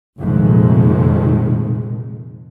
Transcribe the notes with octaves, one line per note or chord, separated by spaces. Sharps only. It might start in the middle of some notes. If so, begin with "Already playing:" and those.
F1 F2 A#2 D#3 G#3